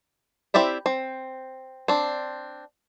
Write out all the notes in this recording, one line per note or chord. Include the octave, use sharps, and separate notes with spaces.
C4 E4 G4 D5 E5
C4
C4 D4